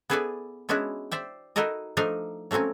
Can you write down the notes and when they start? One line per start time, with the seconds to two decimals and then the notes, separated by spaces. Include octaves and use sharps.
0.10 B3 E4 G#4 A4 B4 D5
0.69 G#3 B3 C#4 D4 E4 F#4
1.11 C5 D5 E5 G5
1.56 D#4 E4 F#4 A4 A#4 D#5
1.97 F3 A3 D4 D#4 A#4 F5
2.51 F#3 A3 A#3 C4 C#4